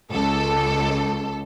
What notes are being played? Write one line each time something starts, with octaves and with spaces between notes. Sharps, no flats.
C#2 A4